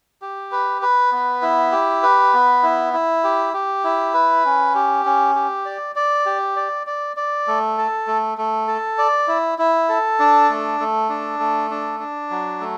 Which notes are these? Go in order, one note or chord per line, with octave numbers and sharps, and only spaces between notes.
G4
B4
B4
B3
E4
G4
B4
B3
E4
E4
G4
G4
E4
B4
C#4
G4
C#4
G4
D5
D5
G4
D5
D5
D5
A3
A4
A3
A3
A4
D5
E4
E4
A4
D4
A3
A3
D4
A3
D4
D4
F#3
A3